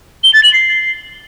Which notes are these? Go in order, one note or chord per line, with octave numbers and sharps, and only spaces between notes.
G7
A6
F#7
C7